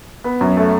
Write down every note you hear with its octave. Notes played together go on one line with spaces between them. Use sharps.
B3
F#2
A3